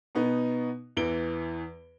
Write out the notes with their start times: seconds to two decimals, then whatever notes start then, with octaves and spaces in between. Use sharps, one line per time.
0.15 B2 B3 D#4
0.97 E2 E3 D7 G7